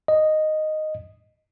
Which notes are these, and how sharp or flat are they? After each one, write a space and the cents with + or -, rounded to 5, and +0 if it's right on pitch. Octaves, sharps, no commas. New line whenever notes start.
D#5 -5